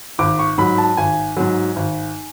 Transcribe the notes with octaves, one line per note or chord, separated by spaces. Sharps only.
G#1 D6
C#6
G#2 F#3 B5
A5
G#1 G#5
G#2 F#3
G#1